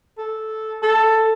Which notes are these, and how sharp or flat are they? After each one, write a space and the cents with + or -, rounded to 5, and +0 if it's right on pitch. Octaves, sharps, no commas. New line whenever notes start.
A4 -10
A4 +10